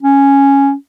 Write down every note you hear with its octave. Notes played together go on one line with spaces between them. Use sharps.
C#4